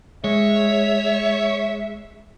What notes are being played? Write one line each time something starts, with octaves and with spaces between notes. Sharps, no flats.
G#3 C#5 E5